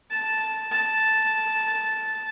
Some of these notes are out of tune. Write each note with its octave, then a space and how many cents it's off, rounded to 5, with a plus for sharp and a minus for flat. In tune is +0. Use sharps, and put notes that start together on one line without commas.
A5 -5
A5 -5